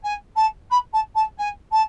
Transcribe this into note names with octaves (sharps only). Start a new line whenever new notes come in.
G#5
A5
B5
A5
A5
G#5
A5